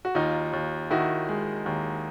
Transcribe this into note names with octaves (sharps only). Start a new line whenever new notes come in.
F#4
D#2 D#4 F4
D#2
D#3 E4 F#4
G#3
D#2